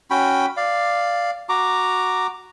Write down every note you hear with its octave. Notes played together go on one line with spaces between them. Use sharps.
C#4 F#4 G5 B5
D5 F5
F#4 A#5 D6